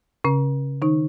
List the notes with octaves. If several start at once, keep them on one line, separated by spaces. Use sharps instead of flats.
C#3 C#4
D#3 D#4